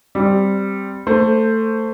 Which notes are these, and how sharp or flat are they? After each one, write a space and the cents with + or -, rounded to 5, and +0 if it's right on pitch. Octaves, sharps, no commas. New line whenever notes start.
G3 +0 C4 +0
A3 +15 C5 +0